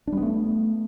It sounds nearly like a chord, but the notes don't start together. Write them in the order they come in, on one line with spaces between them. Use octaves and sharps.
D4 G3 B3 A3